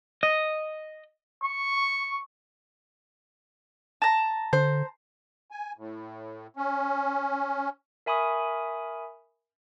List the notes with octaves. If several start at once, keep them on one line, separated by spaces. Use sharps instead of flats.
D#5
C#6
A5 A#5
D3 C5
G#5
A2
C#4
A#4 E5 G#5 B5 C#6 D#6